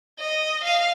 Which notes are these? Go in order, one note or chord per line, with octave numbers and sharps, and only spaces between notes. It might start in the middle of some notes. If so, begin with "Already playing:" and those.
D#5
F5